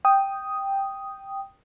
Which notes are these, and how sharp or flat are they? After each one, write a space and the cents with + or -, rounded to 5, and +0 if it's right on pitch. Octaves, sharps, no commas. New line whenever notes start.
G5 +0 D#6 +0